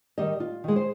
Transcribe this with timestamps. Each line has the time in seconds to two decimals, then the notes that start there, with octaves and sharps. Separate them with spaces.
0.18 D#3 G3 D#5
0.40 F4
0.64 D#3 G#3
0.76 C5